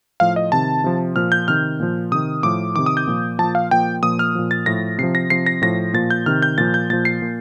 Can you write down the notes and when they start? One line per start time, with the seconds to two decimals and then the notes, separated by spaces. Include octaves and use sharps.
0.20 A2 F3 F5
0.36 D#5
0.52 C3 D#3 A5
0.84 C3 F3
1.16 A#2 F3 F6
1.32 G6
1.48 C3 D#3 F6
1.80 A#2 F3
2.11 C3 D#3 D#6
2.43 A2 F3 D6
2.76 C3 D#3 D6
2.86 D#6
2.97 G6
3.07 A#2 F3
3.39 A#2 F3 A5
3.55 F5
3.71 A#2 F3 G5
4.02 A#2 F3 D#6
4.19 F6
4.35 A#2 F3
4.51 A6
4.66 A2 F3 A#6
4.98 C3 F3 C7
5.15 A#6
5.30 C3 F3 C7
5.46 A#6
5.62 A2 F3 A#6
5.94 A#2 F3 A6
6.10 G6
6.26 C3 D#3 F6
6.42 G6
6.58 A#2 F3 A6
6.74 G6
6.90 A#2 F3 A6
7.05 C7
7.22 A#2